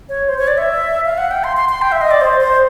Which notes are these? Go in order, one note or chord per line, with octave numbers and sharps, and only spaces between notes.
C#5
C5
C#5
D5
E5
F5
F#5
G5
C6
C6
C6
G5
E5
D#5
D5
C5
C5